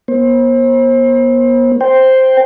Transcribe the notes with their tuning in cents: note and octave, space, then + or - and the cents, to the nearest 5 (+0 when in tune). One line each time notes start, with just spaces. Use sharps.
B3 -40 C5 +35
C5 +0 G5 +0